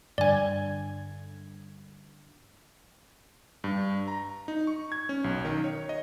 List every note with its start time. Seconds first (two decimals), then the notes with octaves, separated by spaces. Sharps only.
0.18 G2 D3 D5 G#5 G#6
3.64 G2
4.08 A#5
4.48 D#4
4.67 C#6
4.92 G#6
5.09 C#4
5.24 B1
5.45 D#3
5.64 C#5
5.89 D#5